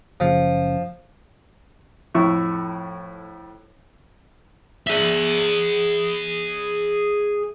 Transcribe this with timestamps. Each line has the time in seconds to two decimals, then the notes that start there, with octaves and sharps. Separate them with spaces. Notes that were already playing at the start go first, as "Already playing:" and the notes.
0.20 F#1 C#3 F3
2.15 F2 A2 E4 C#6
4.87 G#4 E5